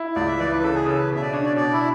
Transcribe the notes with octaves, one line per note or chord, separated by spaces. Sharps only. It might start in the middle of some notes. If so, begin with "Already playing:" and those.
Already playing: E4
C#2 D5
E5
E3 D5
B4
C#3 A4
G#4
C#3 A4
B4
B2
E5
D5
D4 C#5
D5
B2 D5
E4